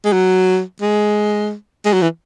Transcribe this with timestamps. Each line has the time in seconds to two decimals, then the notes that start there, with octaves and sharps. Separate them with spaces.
0.05 G#3
0.13 F#3
0.81 G#3
1.85 G#3
1.93 F#3
2.02 E3